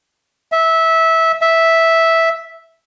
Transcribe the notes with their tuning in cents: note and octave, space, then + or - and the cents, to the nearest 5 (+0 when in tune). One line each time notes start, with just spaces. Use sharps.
E5 -15
E5 -5